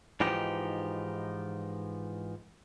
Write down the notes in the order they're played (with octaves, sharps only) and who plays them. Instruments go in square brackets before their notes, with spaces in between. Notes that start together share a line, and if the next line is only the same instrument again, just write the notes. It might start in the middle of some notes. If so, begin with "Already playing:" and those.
[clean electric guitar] G#2 E3 F3 D#4 G4